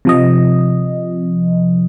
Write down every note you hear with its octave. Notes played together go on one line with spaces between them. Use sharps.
C3 F3 D#5